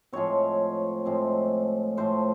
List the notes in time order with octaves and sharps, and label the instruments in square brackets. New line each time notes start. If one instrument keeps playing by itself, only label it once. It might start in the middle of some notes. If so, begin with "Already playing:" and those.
[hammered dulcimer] A2 F3 G#3 C4 C#5
A2 F3 G#3 C4
A2 F3 A3 C4 C5